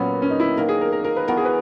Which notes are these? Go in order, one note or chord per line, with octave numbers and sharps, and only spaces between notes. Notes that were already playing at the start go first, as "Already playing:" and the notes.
Already playing: A#2 F#3 B3 C#4
C#4
D#4
E4
D#3 A#3 D#4 A#4
G#4
A#4
A#4
A#4
B4
E3 B3 F#4 A#4
G#4
B4